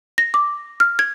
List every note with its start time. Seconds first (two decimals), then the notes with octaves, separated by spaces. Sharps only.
0.18 A#6
0.34 D6
0.80 F6
0.99 G#6